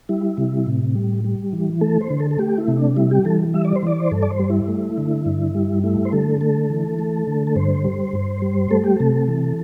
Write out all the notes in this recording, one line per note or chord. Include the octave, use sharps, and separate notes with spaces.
G3 E4
C3
A2
G3
G3
E3
A3 A4
C5
D3
A4
A4
A3 G4
E4
C3
D4
G3 E4
G4
E3 A4
G3 E5
D5
C5
E3 D5
C5
G2 A4
D5
C5
G3
E4
A3
D3
G2
G3
A3 E4
C5
D3 A4
A3 A4
E3
A3
D3
A4
G2 C5
G3
G2
G3
A3 A4
G4
C3 A4
E3